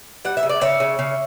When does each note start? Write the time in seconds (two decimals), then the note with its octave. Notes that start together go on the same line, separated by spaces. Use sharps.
0.25 G3 F#5
0.37 E5
0.43 C#3
0.49 D5
0.61 C#3 C#5 E5
0.80 C#3
0.99 C#3